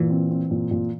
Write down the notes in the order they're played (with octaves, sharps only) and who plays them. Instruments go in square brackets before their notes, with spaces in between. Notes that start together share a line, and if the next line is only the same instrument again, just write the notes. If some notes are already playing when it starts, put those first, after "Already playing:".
Already playing: [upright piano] A#2 [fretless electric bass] E3
[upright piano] C4
C4
A#2
A#2